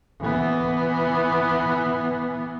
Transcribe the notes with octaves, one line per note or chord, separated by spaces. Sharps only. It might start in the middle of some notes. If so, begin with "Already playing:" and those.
E3 B3